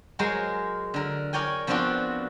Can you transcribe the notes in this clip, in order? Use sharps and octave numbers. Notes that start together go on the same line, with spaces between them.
F#3 G#3 A#4 C5
D3 A#4
A#4 C#5 D5 G5 G#5
F3 B3 C4 D4 F4 F#4